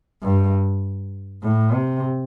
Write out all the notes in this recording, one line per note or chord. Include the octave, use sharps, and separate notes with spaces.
G2
A2
C3